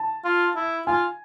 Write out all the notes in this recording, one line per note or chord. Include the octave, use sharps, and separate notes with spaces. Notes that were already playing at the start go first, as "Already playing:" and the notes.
Already playing: A5
F4
E4
F4 G#5